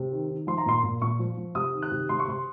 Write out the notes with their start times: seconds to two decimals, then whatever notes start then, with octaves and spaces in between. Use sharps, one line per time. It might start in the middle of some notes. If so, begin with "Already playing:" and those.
Already playing: C3
0.12 D#3
0.29 D#3
0.47 F3 C6
0.58 A#5
0.66 A#2 C6
0.84 A#2
1.02 A#2 C#6
1.19 F3
1.38 F3
1.55 C3 D#6
1.74 D#3
1.82 F#6
1.91 C3
2.09 C3 C6
2.20 C#6
2.28 C3 C6